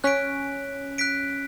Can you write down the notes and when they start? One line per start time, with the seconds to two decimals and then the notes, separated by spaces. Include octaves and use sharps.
0.04 C#4 F#6 B6 D7
0.98 F#6 B6 D7